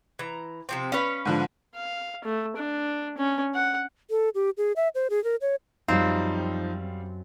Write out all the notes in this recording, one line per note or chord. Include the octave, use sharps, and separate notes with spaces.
E3 A#5
C3 F3 C4
C#4 B4 C#5 F5
G#2 D3 F3
F5
A3
D4
C#4
F#5
A4
G4
G#4
E5
C5
G#4
A#4
C#5
F#2 F3 G3 C4 D#4 F5